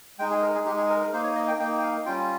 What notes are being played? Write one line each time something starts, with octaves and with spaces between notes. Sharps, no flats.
G#3 D#4 G5
G#4
A#4
G#4
G#3 D#4 G4
G#4
A#4
A#4
A#3 D#4 C5
C#5
D#5
G5
A#3 D#4 G5
G5
F5
G3 C#4 F4 G5